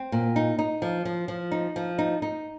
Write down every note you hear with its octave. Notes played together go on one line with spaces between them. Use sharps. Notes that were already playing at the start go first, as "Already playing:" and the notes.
Already playing: C4
A#2
D#4
D#4
F3
F3
F3
D#4
F3
D#4
D#4